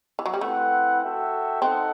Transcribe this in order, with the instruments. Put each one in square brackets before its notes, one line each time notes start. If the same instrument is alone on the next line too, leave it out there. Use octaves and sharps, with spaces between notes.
[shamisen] E3
F#3
G3
[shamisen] A3 [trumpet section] C4 E4 B4 F#5
[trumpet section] F#4 A4 E5 G5
[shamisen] C4 [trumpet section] D#4 A4 D#5 F#5